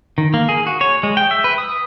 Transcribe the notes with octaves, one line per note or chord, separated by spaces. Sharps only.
D#3
A#3
G#4
F#4
C#5
G#3
G5
E5
B4
D#6